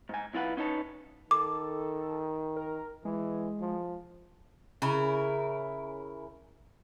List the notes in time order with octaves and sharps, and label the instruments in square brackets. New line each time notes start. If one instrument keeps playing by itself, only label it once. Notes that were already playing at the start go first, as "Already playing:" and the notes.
[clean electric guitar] G#2 G#5
B1 E4 F4 B4 F#5
C#4 D#4 B4 C#5 A5
[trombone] D#3 [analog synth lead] A4 [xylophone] D6
[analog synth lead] A#4
[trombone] E3 [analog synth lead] G#3
[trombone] F3
[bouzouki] C#3 E4 A#4